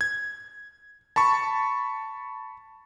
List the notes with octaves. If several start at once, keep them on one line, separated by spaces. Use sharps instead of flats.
G#6
A5 B5 C#6